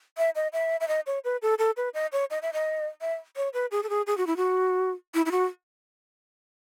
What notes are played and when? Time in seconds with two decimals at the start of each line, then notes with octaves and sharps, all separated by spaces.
0.18 E5
0.35 D#5
0.53 E5
0.80 E5
0.88 D#5
1.06 C#5
1.24 B4
1.42 A4
1.59 A4
1.77 B4
1.94 D#5
2.12 C#5
2.30 D#5
2.42 E5
2.53 D#5
3.01 E5
3.36 C#5
3.53 B4
3.71 G#4
3.83 A4
3.89 G#4
4.07 G#4
4.17 F#4
4.27 E4
4.37 F#4
5.14 E4
5.26 E4
5.31 F#4